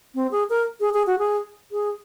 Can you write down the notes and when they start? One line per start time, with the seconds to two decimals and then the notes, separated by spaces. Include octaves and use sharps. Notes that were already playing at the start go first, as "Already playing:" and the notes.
0.15 C4
0.31 G#4
0.50 A#4
0.80 G#4
0.94 G#4
1.07 F#4
1.19 G#4
1.72 G#4